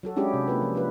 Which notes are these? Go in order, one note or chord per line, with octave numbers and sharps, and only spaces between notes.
F#3 F#4 A4
G#3 C#4 D4 E4 G4 G#4
C3
A#3 F4 B4
F3
F3 D4 F4 B4